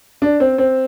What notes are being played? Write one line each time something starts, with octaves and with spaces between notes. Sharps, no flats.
D4
C4
C4